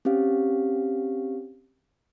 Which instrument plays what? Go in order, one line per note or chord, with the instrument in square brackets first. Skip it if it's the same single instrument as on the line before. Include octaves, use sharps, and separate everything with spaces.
[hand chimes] C4 C#4 G4 F5